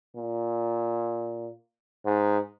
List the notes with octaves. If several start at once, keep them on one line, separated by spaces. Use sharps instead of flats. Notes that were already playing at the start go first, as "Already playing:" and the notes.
A#2
G#2